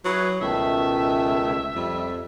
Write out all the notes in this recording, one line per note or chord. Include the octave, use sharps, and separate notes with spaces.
F#3 E4 G#4 B4
C#2 B2 D#3 A3 E5
F2 G3